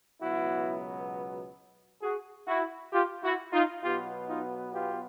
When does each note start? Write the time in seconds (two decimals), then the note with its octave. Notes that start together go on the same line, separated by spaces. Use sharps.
0.22 C#2 B2 F#3 B3 E4 F#4
2.03 F#4 G#4
2.47 E4 F#4
2.93 F4 G4
3.23 E4 F#4
3.53 D#4 F4
3.83 B2 F#3 B3 F4 G4
4.28 D#4 F4
4.73 F4 G4